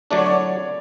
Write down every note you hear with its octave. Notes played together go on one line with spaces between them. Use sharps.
D3 F#3 A3 D4 D5
C#5
D5